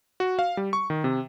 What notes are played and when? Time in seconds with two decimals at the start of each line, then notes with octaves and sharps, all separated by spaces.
0.20 F#4
0.39 F5
0.57 G3
0.73 C#6
0.90 D#3
1.04 C3